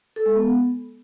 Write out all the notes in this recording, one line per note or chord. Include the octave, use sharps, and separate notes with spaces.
A4
G#3
B3